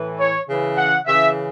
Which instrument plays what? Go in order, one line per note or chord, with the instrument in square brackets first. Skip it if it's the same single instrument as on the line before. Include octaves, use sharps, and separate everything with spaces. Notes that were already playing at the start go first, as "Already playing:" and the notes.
Already playing: [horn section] A2 E3
C#5
C#3 E3
F#5
C#3 E3 E5